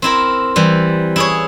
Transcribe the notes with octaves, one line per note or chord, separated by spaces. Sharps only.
C4 E4 A#4
E3 G3
E4 G#4 C#5